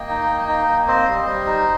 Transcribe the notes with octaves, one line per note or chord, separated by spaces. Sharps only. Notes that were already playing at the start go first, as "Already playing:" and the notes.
Already playing: A#3 D#5 G5
D#4
A#3
D#4
A#3
C4 C5 D#5
G3
G3
D#4